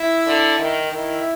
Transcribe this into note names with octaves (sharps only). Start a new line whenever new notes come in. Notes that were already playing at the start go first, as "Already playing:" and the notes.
Already playing: E4 E5
D3
D#3
D#3 E4 E5